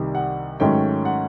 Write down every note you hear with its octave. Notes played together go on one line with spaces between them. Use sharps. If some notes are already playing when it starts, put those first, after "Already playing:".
Already playing: C2 C3 D#3
F#5
G#2 D#3 F#3 A3 C#4 G5
F#5